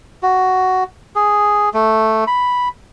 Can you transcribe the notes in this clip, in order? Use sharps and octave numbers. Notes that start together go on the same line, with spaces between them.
F#4
G#4
A3
B5